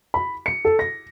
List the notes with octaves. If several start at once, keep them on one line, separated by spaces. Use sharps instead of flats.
B5
C#7
A4
A#6